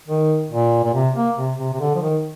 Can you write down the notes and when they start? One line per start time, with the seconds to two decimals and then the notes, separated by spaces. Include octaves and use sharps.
0.08 D#3
0.51 A#2
0.84 A#2
0.94 C3
1.16 A#3
1.37 C3
1.59 C3
1.73 C3
1.80 D3
1.95 F3
2.01 D#3